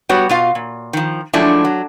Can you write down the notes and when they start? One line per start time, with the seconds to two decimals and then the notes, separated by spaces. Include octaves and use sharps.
0.09 G3 B3 F#4 C#5
0.29 B2 F4 F5
0.55 A#2
0.93 D#3 F3
1.33 F3 F#3 G#3 A3 D4 E4
1.64 F#3